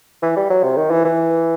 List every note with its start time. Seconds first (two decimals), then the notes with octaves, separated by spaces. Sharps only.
0.22 E3
0.36 G3
0.50 F#3
0.63 C3
0.77 D#3
0.90 E3
1.05 E3